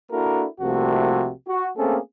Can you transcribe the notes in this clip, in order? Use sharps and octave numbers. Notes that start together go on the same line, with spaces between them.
A#3 D4 E4 F#4 A4 A#4
C2 C3 F3 A3 A#3 F#4
F#4
A3 A#3 C4 C#4 G#4 A4